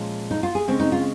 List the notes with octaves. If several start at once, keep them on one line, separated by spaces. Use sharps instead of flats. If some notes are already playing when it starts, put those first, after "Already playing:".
Already playing: A#2 F3 G#3 C#4
D#4
F4
G#4
C#3 G#3 C4
D#4
F4